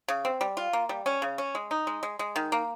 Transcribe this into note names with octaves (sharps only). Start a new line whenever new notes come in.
C#3
C4
G3
F4
A#3
G3
C#4
C#3
C#4
G#3
D#4
G#3
G#3
G#3
D#3
A#3